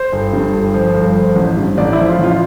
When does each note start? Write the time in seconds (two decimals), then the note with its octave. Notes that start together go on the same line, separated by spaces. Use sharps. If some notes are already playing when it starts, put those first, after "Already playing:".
Already playing: C5
0.12 G1
0.33 G2
0.53 G1
0.74 F3
0.94 G1
1.16 F3
1.36 A1
1.57 G2
1.77 A1 D5
1.93 E4
1.98 F3
2.08 F4
2.19 A1
2.24 F4